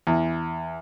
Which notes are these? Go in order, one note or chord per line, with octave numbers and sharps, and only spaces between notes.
E2